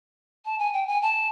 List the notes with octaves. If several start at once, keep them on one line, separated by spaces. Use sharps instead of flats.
A5
G#5
G5
G#5
A5